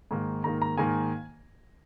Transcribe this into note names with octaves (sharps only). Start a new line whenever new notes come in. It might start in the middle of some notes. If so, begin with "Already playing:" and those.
G#2 D#3 A#3
G#2 D#3 A#3 A#5
A#5
G#2 D#3 A#3 G#5